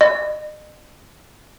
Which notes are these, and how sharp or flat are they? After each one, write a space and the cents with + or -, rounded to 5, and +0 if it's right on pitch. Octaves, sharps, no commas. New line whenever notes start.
D#5 -40